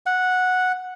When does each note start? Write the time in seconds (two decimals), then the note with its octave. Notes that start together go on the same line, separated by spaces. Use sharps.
0.06 F#5